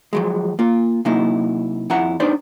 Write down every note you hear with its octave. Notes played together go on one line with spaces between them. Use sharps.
F3 F#3 G#3
A#3 F4
C3 F#3 A#3 D#4 E4
F2 E4 F#5 A#5
D4 D#4 B4 C5 D5